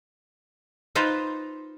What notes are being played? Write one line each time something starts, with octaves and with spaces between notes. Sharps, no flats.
D#4 F4 B4 C5